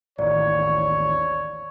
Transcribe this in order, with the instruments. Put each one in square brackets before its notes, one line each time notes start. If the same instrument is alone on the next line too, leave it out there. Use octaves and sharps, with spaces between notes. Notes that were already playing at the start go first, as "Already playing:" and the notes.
[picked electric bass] A1 D#2 [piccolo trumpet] C#5 [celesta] D5